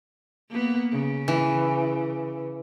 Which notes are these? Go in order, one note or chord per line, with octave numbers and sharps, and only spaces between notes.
A#3 B3
C#3
E3